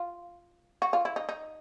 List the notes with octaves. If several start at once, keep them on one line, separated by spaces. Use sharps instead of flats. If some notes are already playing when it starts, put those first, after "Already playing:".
Already playing: F4
F#4
F4
E4
D#4
D#4